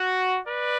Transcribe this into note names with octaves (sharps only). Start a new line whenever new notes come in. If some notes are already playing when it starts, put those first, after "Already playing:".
Already playing: F#4
B4 D5